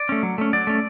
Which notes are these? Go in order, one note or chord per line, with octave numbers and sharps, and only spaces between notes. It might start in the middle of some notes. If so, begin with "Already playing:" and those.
Already playing: D5
A3 C#4
F#3
A3 C#4
F#3 D5
A3 C#4